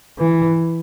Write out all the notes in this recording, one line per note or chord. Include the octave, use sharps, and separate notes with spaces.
E3